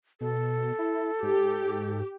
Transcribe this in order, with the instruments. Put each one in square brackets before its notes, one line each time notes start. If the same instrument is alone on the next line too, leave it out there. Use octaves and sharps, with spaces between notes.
[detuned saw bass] B2 [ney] A4
[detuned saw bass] E4
[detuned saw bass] G#2 [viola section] G4